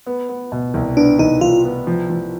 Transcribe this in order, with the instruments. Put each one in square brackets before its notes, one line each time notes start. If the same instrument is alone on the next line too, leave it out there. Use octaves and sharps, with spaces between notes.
[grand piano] B3
B3
B2
C2
[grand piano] B3 [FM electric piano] D4
[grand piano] C2 [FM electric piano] D#4
[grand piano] C2 [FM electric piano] F4
[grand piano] B3
F3
F3